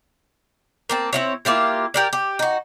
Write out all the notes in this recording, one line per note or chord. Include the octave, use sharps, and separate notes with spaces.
A#3 C4 A5
C4 E4 C#5
A#3 E4 F4 G4
G4 A#4 D5
G4
D#4 F#4